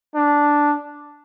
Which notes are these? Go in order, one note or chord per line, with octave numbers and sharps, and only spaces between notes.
D4